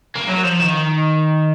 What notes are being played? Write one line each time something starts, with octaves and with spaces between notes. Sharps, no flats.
A#3
F#3
F3
D#3